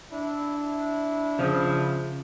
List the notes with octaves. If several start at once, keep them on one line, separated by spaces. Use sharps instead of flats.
D4 E4
C#3 F3